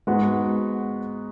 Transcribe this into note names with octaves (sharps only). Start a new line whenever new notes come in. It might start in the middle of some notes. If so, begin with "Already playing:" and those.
G#2 G#3 B3 F#4